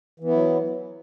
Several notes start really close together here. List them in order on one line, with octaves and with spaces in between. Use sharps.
E3 B3 E4 F#3